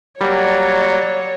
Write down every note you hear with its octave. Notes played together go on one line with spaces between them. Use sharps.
F#3 G3 A#3 C#5 D5